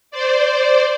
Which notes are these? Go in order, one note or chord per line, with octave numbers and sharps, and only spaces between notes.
C5 D5